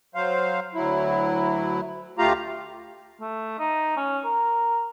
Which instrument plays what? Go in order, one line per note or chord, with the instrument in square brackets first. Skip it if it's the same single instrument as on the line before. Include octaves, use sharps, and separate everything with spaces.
[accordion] F#3 C5 F5
D2 F#3 E4
D2 A3 F4 G4 F5 A#5
[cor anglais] A3
D#4
C#4
A#4